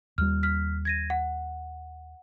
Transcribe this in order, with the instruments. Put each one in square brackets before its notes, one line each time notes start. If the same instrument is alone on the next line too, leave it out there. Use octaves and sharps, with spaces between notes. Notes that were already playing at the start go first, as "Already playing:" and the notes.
[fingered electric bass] D#2 G3 [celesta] F6
[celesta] F6 B6
G#6 A#6 D#7
F#5